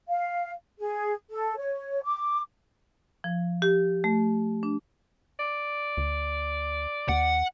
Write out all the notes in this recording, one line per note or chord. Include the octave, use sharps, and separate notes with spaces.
F5
G#4
A4
C#5
D6
F3
G4
A3
D4
D5
D2
D#2 F#5